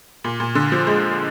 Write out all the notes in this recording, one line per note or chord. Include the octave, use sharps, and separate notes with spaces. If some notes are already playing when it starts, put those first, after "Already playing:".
A#2
A#2
D3
F3
G#3